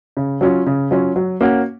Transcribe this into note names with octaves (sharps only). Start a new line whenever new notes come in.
C#3
F#3 C#4 F4
C#3
F#3 C#4 F4
F#3
A#3 C#4 F#4